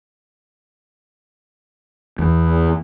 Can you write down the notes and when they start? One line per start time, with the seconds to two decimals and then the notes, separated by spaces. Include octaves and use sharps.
2.19 E2